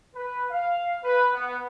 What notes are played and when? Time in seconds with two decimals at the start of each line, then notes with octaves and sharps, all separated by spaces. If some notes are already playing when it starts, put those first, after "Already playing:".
0.15 B4
0.51 F5
1.04 B4
1.34 B3